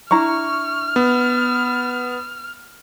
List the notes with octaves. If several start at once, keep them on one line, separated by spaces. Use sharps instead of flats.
D4 E4 A#5 C#6 F6
B3